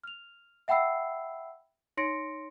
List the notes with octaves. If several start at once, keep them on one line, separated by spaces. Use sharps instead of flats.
F6 F7
E5 F#5 G5 B5 E6 C7
D#4 C#5 C6 A#6 C#7 D7